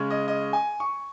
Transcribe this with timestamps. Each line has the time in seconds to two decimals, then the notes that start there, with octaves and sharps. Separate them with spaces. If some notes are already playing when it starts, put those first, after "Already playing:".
Already playing: C#3 G#3 C#4
0.10 D#5
0.28 D#5
0.53 G#5
0.80 C#6